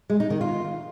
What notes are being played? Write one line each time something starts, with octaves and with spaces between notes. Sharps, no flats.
G#3
D#4
D#3
F4